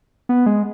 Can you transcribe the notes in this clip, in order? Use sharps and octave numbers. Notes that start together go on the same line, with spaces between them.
B3
G#3